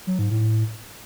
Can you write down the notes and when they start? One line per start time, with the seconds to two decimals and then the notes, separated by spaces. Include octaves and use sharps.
0.07 F#3
0.19 G#2
0.31 A2